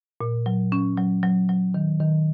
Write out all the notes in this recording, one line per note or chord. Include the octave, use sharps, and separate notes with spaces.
A#2
F#3
C#4
F#3
F#3
F#3
D#3
D#3